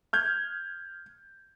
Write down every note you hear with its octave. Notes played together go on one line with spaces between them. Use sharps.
F6 G6 G#6